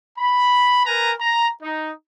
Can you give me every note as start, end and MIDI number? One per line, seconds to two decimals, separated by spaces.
0.19 0.86 83
0.86 1.13 70
0.86 1.13 71
0.86 1.13 80
0.86 1.13 82
1.20 1.50 82
1.63 1.92 63